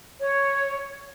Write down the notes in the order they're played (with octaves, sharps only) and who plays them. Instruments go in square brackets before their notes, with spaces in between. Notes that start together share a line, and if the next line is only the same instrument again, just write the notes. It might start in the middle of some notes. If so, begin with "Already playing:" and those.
[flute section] C#5